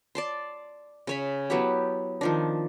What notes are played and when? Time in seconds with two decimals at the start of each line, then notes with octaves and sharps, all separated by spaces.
0.15 D5 A5 C6
1.07 C#3 C#5 B5
1.50 F#3 B3 E4 G4
2.21 D#3 F3 D4